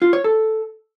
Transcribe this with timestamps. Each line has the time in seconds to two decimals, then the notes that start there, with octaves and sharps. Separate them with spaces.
0.02 F4
0.13 C#5
0.24 A4